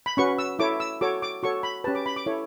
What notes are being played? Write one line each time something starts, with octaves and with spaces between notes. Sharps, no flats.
B5
C#4 F#4 B4 C#6
E6
E4 A4 C#5 D6
E6
F#4 A4 C#5 D6
D6
F#4 A4 C#5 C#6
B5
C#4 G4 B4 A5
D6
B5
D6
E4 A4 C#5